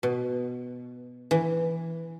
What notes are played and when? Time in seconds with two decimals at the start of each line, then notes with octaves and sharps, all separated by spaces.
0.03 B2
1.31 E3